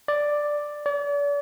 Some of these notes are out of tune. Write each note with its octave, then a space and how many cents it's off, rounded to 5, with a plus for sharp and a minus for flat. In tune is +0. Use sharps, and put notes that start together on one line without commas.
D5 +5
D5 -40